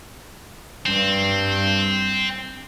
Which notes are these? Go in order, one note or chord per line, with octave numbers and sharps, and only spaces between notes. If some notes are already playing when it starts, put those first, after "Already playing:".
G2 C4